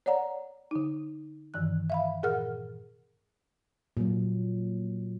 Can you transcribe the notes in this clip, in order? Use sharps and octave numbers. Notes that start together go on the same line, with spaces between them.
C#5 D5 F#5 A#5
D3 D#4
G2 D#3 E3 F#6
E5 F5 B5
A#2 G#4 A#4 F#5 F6
A#2 F#3